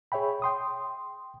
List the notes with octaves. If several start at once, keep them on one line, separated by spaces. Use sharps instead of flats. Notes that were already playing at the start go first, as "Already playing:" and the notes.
G#4 C#5 E5 G5 B5
G5 C6 D#6